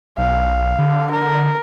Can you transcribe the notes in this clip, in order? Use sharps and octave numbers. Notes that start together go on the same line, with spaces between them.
B1 F5
D3
A#4